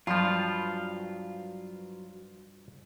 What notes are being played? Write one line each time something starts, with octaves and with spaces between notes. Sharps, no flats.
G2 F3 F#3 F4 B4